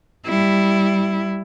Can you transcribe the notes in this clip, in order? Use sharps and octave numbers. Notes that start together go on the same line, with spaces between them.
G3 E4